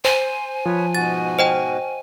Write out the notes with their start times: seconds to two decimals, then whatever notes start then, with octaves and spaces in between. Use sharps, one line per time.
0.05 C5 G#5
0.66 F3 B4 C#5
0.95 G#2 B2 F#4 A6
1.39 C5 D#5 G5